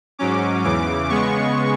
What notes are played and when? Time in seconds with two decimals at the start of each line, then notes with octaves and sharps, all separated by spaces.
0.19 G#2 F#3 C#4 D6
0.64 E2 C#3 E3 D6
1.09 C#3 G#3 B3 C#6